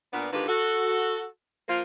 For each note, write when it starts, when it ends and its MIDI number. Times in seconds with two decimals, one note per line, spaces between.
0.13 0.28 46
0.13 0.28 59
0.13 0.28 62
0.33 0.48 44
0.33 0.48 50
0.33 0.48 51
0.33 0.48 65
0.33 0.48 67
0.33 0.48 71
0.48 1.26 66
0.48 1.26 69
1.69 1.82 53
1.69 1.82 58
1.69 1.82 65